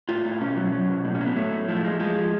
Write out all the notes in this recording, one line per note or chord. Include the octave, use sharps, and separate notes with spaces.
A2 F4
A2
B2 C#4
F#3
F#3
B2
A2
C#4
F#3
B3
A2 A3
A2
F3 A3
F3 G#3
F3 G#3
F3